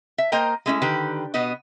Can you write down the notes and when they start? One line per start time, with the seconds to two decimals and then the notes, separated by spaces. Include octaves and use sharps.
0.18 E5
0.32 A#3 A#4 C5 D#5 G5 A#5
0.66 G#3 A3 C#4 D#4 E4
0.82 D3 D#3 G4 B4
1.34 B2 B3 F#4 D#5